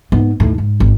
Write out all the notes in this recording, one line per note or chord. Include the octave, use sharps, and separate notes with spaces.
G#2 B3
D#2 A2
G#2
G#1